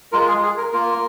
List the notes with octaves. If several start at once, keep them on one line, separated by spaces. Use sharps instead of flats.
G#3 F4 A#4
G#4
G#4
A#4
A#3 F4 A#4